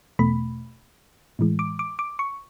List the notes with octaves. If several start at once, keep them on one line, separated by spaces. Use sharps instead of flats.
E2 B2 A3 B5
A2 E3 G#3
D6
D6
D6
C#6